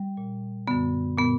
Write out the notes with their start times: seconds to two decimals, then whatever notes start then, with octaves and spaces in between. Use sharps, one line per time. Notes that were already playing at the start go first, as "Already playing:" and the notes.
Already playing: G3
0.17 A#2
0.68 F#2 D3 B3
1.17 A#2 B3